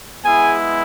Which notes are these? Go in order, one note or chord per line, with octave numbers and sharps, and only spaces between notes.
G#3 B3 E4 G#4 G#5